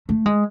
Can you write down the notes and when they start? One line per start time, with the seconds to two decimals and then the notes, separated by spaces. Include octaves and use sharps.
0.09 A3
0.26 G#3